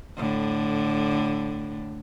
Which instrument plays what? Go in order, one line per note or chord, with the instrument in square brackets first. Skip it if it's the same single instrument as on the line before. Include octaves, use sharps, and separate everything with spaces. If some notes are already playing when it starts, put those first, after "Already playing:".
[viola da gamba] A2 D3